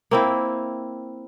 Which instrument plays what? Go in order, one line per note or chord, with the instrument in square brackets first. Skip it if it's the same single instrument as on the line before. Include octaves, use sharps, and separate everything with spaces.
[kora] A#3 C4 E4